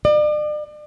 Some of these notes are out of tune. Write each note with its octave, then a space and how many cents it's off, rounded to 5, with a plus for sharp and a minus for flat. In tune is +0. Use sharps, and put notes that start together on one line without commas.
D5 +40